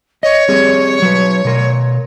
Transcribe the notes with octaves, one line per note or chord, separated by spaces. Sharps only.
C#5 D#5
G3 C4 G#4
F#3 B4
B2 A#4